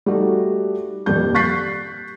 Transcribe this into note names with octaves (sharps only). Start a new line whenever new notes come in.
G3 A3 D#4 F#4 A4
D#1 F2 G3 G6
C#6 F#6 G6 A6 B6 C7